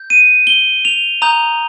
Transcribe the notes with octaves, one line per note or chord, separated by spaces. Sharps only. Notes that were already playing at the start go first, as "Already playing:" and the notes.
Already playing: G6
D#7
G7
F7
A#5 D#6 G6 F7